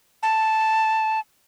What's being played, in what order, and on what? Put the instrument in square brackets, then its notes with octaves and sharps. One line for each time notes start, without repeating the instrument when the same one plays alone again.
[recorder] A5